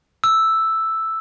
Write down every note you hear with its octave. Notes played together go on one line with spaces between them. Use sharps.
E6